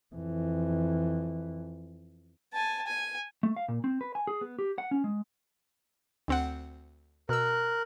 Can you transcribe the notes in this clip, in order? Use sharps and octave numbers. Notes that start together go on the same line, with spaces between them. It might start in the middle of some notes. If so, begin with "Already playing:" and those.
F2 E3
G#5 A5
G#5
A3
F5
A#2
C4
B4
G#5
G#4
B3
G4
F#5
C#4
G#3
D2 C4 F#5
B2 A#4 E6 F#6